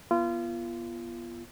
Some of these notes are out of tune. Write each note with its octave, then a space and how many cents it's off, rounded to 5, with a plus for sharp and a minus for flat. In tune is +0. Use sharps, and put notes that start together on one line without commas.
B3 -25 F4 -30